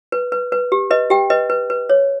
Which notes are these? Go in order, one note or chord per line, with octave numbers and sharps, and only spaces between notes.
B4
B4
B4
G4
B4 D#5
G4 G5
B4 D#5
B4
B4
C#5